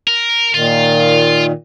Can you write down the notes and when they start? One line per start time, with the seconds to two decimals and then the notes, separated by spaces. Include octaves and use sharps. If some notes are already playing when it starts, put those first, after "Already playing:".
0.07 A#4
0.54 A#2 D#3 F4